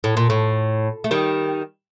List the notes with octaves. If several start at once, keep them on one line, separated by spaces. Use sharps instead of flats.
A2
A#2
A2
A3
D#3 G3